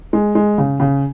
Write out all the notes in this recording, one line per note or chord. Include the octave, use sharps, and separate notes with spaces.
G#3
G#3
C#3
C#3